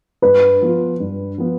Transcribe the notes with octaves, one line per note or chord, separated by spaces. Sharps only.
G2 B4
F3 B3 F4
G2
F3 B3 F4